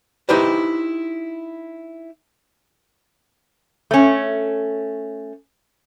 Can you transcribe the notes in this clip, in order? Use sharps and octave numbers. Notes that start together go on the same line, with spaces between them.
D#4 E4 G4 B4 C5
A3 C#4